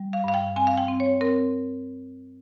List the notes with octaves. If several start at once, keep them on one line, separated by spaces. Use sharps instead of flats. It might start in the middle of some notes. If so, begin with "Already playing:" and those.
Already playing: G3
F5
G2 F5
G5
C4 G#5
F5
G5
C4
C#5
C4 A#4